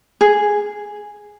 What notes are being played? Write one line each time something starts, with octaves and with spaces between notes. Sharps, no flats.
G#4